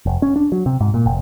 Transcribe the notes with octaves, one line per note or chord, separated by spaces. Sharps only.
F1
C#4
D4
F#3
C3
G#2
A#2
F1